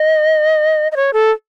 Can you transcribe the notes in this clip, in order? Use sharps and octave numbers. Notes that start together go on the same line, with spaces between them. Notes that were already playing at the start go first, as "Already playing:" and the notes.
Already playing: D#5
D#5
C#5
A4